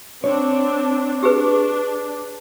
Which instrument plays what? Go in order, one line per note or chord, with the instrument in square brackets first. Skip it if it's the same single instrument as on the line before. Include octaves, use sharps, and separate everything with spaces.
[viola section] C4 D4 [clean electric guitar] C#5
[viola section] D4 [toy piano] G4 G#4 B4